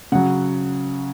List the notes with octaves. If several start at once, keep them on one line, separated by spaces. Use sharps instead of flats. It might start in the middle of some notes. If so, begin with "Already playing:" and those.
C#3 F#3 F#5